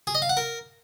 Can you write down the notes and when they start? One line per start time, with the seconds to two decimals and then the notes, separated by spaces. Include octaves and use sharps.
0.07 G#4
0.15 D#5
0.22 F5
0.29 F#5
0.37 A#4